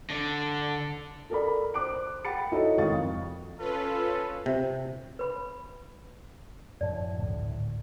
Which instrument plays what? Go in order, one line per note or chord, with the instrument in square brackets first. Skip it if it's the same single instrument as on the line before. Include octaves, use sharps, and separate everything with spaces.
[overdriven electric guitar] D3
[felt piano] A4 A#4 D5 B5
C5 D6 F#6 D7
F#5 G5 B5 A6 C#7
D#4 E4 F#4 A4 C#5 D#5
G#1 D#3 F5 C#6 D#6 A6
F2
[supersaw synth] C#4 F4 B4 [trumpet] A4
[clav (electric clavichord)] C3
[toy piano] B4 B5
[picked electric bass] F#2 A2 F3 [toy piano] D5
[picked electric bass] G#1 D2 A2